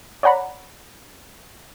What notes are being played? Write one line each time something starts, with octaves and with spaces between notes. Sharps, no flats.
C#5 D5 F#5 A#5 B5